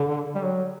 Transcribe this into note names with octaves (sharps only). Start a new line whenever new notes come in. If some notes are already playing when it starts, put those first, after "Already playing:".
Already playing: D3
G3
F#3